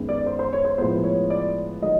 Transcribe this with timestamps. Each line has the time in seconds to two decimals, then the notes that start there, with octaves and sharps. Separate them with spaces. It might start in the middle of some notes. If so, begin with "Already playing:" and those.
Already playing: F#2 D#3 G#3 B3
0.09 D5
0.26 C5
0.39 C5
0.53 C#5
0.65 C5
0.78 A2 F3 G#3 B3 C5
1.04 C#5
1.30 D5
1.82 D#3 F#3 A3 D#5